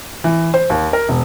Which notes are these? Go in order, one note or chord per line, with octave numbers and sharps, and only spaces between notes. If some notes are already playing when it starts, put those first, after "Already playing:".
E3
C5
D#2
A#4
E1